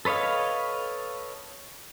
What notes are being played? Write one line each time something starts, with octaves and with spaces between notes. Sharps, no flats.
A4 B4 C#5 D#5 F5